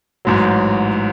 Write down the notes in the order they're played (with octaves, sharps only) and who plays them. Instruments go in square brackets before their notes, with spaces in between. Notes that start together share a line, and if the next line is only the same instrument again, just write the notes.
[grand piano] A1 G#2 F#3